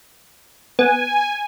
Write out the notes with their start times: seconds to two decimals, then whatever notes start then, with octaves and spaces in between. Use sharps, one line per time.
0.79 B3 G#5